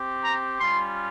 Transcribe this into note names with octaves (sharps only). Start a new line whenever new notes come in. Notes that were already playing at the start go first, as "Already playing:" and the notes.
Already playing: C4 G4
A#5
G3 C#4 F4 C6